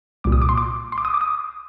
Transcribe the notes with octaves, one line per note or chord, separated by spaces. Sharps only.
C2 A#2 D6
D#6
D6
C6
D6
C6
D6
D#6
D6
D#6